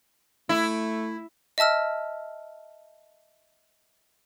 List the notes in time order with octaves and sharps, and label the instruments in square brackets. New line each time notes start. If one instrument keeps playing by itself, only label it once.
[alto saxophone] A3 [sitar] E4
[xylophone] D#5 E5 A5 E6 F6